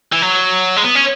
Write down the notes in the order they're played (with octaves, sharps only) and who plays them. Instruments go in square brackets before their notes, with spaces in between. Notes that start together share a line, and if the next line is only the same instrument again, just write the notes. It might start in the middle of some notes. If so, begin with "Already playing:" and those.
[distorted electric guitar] E3
F#3
G#3
B3
C#4